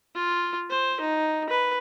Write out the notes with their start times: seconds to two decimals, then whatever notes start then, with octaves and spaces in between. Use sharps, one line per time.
0.15 F4
0.70 C5
1.00 D#4
1.49 B4